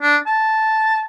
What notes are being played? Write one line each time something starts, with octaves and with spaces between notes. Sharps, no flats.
D4
A5